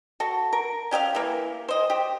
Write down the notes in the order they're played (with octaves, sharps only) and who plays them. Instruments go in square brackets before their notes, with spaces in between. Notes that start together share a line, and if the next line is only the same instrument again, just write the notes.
[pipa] F#4 A4
A#4
C#4 G4 D#5 F5
E3 A#3
C5 D#5
G4